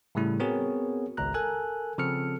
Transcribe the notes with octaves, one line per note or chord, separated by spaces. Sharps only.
A2 C#3 G3 A3 E4
B3 C4 F#4 G#4 A#4 C#5
G#1 C#2 A#5 F#6
A4 A#4 G#5 F#6
C#3 F3 C4 A4 F6 C#7